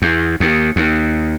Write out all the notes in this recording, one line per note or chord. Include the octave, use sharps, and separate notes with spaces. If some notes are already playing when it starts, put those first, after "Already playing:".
E2
D#2
D#2